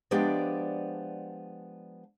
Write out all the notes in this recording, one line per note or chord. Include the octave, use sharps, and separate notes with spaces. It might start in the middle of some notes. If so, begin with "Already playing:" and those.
F3 G#3 B3 D4 G4 D5